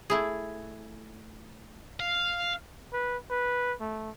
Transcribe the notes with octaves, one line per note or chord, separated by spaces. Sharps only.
A3 E4 G#4
F5
B4
B4
A3